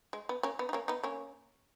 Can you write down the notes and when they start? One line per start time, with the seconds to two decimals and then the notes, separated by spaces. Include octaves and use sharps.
0.13 G#3
0.29 B3
0.43 A#3 C#4
0.59 B3
0.69 D#4
0.73 A#3 C#4
0.88 B3 D#4
1.03 A#3 C#4